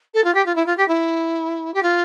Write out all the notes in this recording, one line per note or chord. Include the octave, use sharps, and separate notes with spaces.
A4
F4
G4
F4
E4
F4
G4
E4
G4
F4